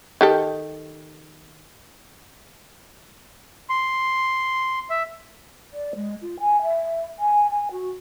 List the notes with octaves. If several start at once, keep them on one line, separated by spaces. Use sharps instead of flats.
D#3 G4 A4
C6
E5
D5
G#3
F4
G#5
E5
G#5
G#5
F#4